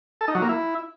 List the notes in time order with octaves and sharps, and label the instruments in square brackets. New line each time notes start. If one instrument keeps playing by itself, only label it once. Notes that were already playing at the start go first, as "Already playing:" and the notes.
[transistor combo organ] A4
D#4
F#3
A#3
E4